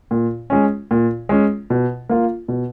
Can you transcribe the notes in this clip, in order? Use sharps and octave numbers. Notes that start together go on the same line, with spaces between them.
A#2
G#3 C#4
A#2
G#3 C#4
B2
A#3 F4
B2